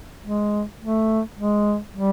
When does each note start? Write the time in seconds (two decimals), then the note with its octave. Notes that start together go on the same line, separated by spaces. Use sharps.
0.23 G#3
0.81 A3
1.38 G#3
1.95 G3